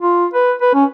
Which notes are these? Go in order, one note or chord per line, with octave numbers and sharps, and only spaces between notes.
F4
B4
B4
C#4